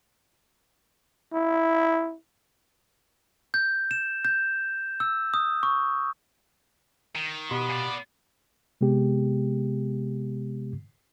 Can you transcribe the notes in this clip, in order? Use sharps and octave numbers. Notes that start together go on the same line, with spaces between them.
E4
G6
E7
G6
E6
D#6
C#6
D#3
B2 B3 G4 C6
A#2 D5
C3 G#3 B3 G4